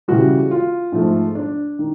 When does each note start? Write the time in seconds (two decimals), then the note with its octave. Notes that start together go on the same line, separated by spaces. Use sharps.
0.08 C#3 E3 G3 F#4
0.51 F4
0.92 G#2 F3 A3
1.35 D4
1.79 D#3